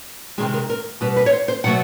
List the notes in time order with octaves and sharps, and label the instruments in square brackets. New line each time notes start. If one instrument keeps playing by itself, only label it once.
[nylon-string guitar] C3 D#3 G#3 G#4
A#4
A#4
B2 G3 B4
B4
C#5
C5
C5
B2 F#3 A3 F#5